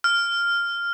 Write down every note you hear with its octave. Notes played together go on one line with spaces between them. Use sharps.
F6